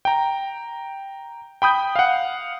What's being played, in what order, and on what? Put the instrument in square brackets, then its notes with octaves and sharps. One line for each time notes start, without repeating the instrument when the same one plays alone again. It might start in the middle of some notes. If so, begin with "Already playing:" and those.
[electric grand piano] G5 A#5
G5 B5 D#6 G6
F5 F#5